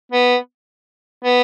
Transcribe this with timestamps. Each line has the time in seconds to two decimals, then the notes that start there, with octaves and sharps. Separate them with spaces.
0.12 B3
1.25 B3